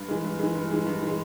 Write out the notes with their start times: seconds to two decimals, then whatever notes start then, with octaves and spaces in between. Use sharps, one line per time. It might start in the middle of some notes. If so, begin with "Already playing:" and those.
Already playing: G2
0.08 E3 G#3
0.24 G2
0.39 E3 G#3
0.55 G2
0.71 E3 G#3
0.87 G2
1.03 E3 G#3